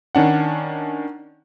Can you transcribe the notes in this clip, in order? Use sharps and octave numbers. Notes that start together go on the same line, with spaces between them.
D#3 C#4 D4 F#5